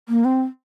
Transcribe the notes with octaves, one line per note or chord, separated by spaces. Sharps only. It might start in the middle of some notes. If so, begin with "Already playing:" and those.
A#3
C4